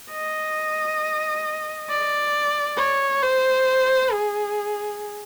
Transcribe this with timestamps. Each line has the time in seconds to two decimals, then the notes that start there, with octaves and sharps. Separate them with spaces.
0.12 D#5
1.90 D5
2.78 C#5
3.22 C5
4.12 G#4